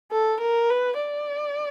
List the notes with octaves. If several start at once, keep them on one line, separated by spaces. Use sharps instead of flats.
A4
A#4
B4
D5